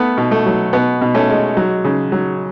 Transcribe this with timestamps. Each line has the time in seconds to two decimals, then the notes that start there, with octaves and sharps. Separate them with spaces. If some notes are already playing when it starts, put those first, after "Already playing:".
Already playing: A3 B3
0.17 B2
0.31 A3
0.46 F#3
0.73 B2 B3
1.01 B2
1.14 A3 C#4
1.29 G#3
1.57 F#3
1.84 C#3
2.12 F#3